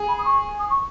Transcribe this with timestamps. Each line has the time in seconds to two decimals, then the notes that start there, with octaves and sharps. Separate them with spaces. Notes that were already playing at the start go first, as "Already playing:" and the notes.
Already playing: G#4
0.08 B5
0.19 D#6
0.25 C#6
0.59 D#6
0.70 C#6